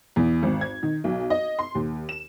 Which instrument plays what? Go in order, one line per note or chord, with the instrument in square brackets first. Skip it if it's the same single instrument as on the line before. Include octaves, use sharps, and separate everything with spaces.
[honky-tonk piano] E2
G#1
G#6
D#3
B1
D#5
C6
D#2
E7